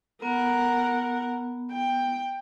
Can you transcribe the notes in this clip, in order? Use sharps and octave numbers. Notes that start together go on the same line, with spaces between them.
B3 A#4 F#5
G5